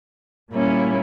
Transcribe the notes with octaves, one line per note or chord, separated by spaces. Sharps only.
A#2 G3 A#3 C#4 E4